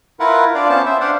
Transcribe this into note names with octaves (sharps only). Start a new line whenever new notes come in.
E4 F4 A#4 B4 F#5
D4 F4 D5 F5
B3 C#4 C5 A5
C5 E5
D4 C5 D5 F5 F#5